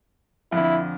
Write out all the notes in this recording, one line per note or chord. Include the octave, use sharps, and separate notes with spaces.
F2 D3 E4